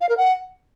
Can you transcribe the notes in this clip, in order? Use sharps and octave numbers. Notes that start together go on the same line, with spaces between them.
F5
A#4
F#5